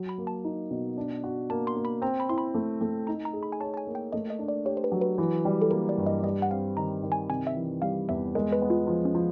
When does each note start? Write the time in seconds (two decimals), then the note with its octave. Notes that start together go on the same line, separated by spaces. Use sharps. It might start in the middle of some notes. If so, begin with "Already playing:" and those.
Already playing: F#3
0.09 B5
0.18 A#3
0.27 A5
0.44 D#4
0.71 B2
0.97 D4
1.24 F#4
1.50 A#3 A5
1.67 C6
1.76 A#3
1.85 B5
2.02 C4 A#5
2.20 B5
2.29 E4 C6
2.38 B5
2.54 A3
2.81 A3
3.07 D#4 A#5
3.25 A#5
3.33 G#4
3.43 B5
3.52 G#5
3.60 C#5 A5
3.74 A5
3.77 G#5
3.87 A#3
3.95 G5
4.12 A3 D#5
4.30 D#5
4.39 D4
4.48 D5
4.65 G4 C#5
4.77 C5
4.84 B4
4.92 F#3
5.01 B4
5.18 E3
5.45 G3
5.62 A4
5.71 A#3 A#4
5.89 D5
5.98 G2
6.06 D#5
6.23 G3 D#5
6.42 F#5
6.50 C4 F5
6.77 D#3 A#5
7.03 D#3
7.12 G#5
7.29 C3 G#5
7.47 E5
7.56 E3
7.82 G3 F5
8.09 E2 E5
8.35 G#3 A#4
8.52 B4
8.62 B3
8.70 F4
8.87 F3
9.05 C#4
9.15 F3